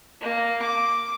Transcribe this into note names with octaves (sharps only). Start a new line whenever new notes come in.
A#3
D6